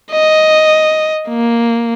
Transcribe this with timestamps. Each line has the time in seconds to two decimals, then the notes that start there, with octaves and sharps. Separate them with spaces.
0.11 D#5
1.29 A#3